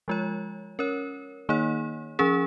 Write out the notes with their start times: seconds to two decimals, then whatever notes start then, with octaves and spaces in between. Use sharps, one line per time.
0.08 F3 G#3 F4 C#5
0.79 C#4 A#4 C#5
1.49 D#3 A#3 D#4 C#5
2.19 F3 C#4 G#4